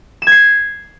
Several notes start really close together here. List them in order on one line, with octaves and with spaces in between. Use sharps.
E7 G#6 C7